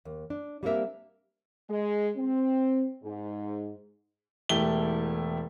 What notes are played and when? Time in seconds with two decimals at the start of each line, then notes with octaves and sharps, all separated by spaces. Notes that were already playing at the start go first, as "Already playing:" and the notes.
0.05 D#2
0.30 D4
0.63 G3 A#3 C4 D4 A#4 E5
1.70 G#3
2.16 C4
3.03 G#2
4.49 E1 A3 E4 G4 G7